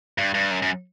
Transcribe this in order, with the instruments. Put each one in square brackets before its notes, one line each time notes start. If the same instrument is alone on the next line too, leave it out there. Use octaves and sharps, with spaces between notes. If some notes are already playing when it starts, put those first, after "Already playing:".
[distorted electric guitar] G2
G2
F#2
F#2